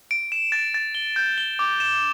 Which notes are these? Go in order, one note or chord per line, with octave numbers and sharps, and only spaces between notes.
D7
E7
A6
A6
G7
G6
G7
D6
E7